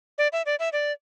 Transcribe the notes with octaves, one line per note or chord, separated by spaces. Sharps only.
D5
E5
D5
E5
D5